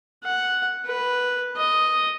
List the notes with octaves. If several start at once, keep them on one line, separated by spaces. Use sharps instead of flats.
F#5
B4
D#5